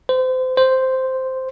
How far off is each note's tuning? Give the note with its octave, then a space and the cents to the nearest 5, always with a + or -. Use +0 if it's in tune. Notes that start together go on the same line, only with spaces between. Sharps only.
C5 -30
C5 -5